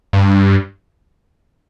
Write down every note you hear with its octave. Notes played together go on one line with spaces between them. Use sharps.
G2